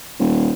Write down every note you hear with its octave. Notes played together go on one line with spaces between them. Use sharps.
D#1